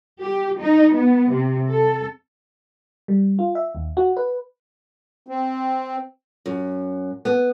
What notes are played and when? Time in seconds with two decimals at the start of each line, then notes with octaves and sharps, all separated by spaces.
0.21 G4
0.60 D#4
0.94 B3
1.31 C3
1.70 A4
3.08 G3
3.39 F4
3.55 E5
3.75 D#2
3.97 F#4
4.17 B4
5.27 C4
6.46 F#2
7.25 B3